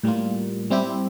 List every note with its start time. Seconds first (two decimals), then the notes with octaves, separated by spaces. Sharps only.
0.03 A2 G3 A#3 F4
0.70 G3 C4 E4 G4